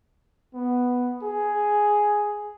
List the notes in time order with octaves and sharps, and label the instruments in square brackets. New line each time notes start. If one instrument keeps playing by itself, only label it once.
[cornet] B3
G#4